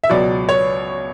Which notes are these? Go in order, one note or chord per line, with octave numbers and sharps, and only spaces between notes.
E5
C#2 B2 F#3 D5
C#5